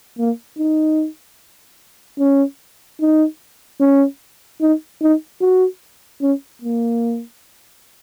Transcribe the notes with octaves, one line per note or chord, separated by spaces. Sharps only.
A#3
D#4
C#4
D#4
C#4
D#4
D#4
F#4
C#4
A#3